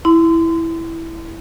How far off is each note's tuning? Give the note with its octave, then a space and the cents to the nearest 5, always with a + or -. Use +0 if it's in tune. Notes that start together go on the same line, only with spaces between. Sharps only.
E4 +0 C6 -30